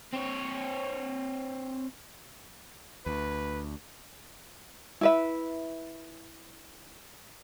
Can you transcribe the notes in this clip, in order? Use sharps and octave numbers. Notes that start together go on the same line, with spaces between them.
C4 C#5
D2 B4
E4 B4 E5